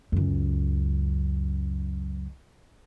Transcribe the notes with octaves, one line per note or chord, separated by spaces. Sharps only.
C#2 F#2